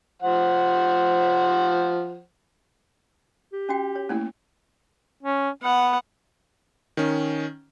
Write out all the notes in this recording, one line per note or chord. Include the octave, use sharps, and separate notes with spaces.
F3 C5 F#5
G4
C#4 F#4 G5
C#5
A3 A#3 C#4 E4
C#4
B3 F#5
D#3 C#4